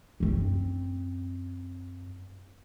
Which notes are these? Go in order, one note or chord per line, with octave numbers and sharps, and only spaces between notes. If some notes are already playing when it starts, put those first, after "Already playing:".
F#2 C4